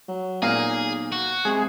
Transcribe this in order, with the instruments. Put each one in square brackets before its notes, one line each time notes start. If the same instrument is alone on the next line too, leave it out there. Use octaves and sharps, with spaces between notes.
[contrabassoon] F#3
[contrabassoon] B1 [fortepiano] A#2 A#3 F5 [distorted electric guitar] G#4
[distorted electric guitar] F#4
[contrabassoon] C3 [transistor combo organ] G#3 G#4